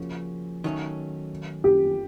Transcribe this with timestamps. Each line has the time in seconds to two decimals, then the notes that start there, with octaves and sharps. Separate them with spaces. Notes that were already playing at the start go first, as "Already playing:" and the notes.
Already playing: C#3 F3 A#3 C#4 F#4
0.64 D#3 F#3 A3 C#4
1.64 G4